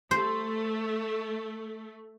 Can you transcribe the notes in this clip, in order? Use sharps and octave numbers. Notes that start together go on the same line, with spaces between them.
A3 C5